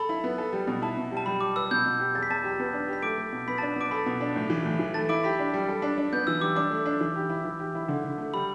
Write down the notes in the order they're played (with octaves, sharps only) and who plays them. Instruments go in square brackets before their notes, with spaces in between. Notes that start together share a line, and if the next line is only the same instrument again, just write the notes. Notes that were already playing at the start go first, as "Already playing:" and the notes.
Already playing: [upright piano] A4 [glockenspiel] B5
[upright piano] E4
B3
A4
G3
B2
[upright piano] E4 [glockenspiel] A5
[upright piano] B2
G3
[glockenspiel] A5
[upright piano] G3 [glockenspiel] B5
[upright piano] G3 [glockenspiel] D6
[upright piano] B4 [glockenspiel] E6
[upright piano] B2 [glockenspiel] G6
[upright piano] B2
G4
[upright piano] E2 [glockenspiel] A6
[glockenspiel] B6
[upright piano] E2 [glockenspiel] A5 A6
[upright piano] G4
B3
D4
G4
[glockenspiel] B6
[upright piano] A3 [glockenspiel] D6 D7
[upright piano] A3
B2
[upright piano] B3 [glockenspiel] B5 B6
[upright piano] D4 [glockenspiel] A5 A6
[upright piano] B3 [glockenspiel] D6 D7
[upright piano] A4 [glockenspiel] B5 B6
[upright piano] B2
D4
A2
E3
A2
E3
[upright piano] A3 [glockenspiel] A5 A6
[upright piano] E4 [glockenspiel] D6 D7
[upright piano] G4 [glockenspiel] B5 B6
[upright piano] D4
G3
A4
D4
D4
[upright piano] B3 [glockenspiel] G6
[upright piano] E3 [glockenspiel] E6
[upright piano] G3 [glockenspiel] D6
[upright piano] D4 [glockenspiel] D6
[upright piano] A3
D4
E3
G4
E4
E3
G4
E4
D3
D3
A3
[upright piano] G3 [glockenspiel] B5